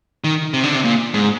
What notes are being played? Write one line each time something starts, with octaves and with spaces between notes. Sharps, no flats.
D#3
C3
D3
C3
A#2
G#2